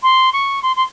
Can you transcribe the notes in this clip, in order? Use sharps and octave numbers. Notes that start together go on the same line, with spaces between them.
C6
C#6
C6
C6